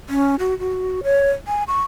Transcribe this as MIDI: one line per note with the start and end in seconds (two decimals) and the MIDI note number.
0.09 0.35 61
0.39 0.57 66
0.59 1.00 66
1.03 1.30 73
1.48 1.63 80
1.68 1.81 85